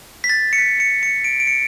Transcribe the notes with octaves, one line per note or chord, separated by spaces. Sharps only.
B6
A6
C#7
B6
C#7
C#7
D7
D7
C#7